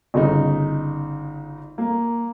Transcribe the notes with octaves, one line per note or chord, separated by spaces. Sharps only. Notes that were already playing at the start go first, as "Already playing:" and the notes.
G1 C#3 D#4
A#3